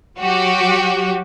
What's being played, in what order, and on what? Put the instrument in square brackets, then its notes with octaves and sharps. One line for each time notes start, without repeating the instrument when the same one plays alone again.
[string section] F#3 F#4 G4